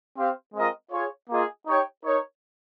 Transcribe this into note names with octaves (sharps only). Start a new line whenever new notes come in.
C4 G4 C5 F5
G#3 C4 F4 A#4 D#5
F4 G#4 C#5
A#3 F4 G#4 D#5
D#4 G4 C#5 G5
D#4 A#4 C#5